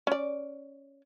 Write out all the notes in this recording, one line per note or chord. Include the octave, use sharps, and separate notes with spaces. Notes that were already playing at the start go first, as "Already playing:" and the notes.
C#4 D5